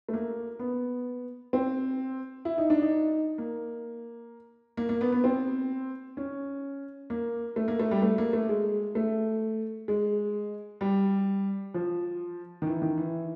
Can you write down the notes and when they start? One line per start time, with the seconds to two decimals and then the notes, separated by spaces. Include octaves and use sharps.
0.09 A3
0.14 A#3
0.59 B3
1.53 C4
2.45 E4
2.58 D#4
2.70 D4
2.82 D#4
3.38 A#3
4.77 A#3
4.89 A#3
5.01 B3
5.12 B3
5.24 C4
6.17 C#4
7.10 A#3
7.56 A3
7.68 A#3
7.79 A3
7.91 G3
8.02 A3
8.18 A#3
8.33 A3
8.49 G#3
8.95 A3
9.88 G#3
10.81 G3
11.74 F3
12.62 D#3
12.67 E3
12.82 D#3
12.98 E3